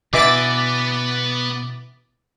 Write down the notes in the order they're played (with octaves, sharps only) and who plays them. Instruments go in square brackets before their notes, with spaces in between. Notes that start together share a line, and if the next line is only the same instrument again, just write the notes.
[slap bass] B2 [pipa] D3 E3 E5 [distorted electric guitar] B3 B4 [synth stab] D6 A6